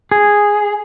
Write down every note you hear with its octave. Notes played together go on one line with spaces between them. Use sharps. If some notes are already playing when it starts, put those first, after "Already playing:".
G#4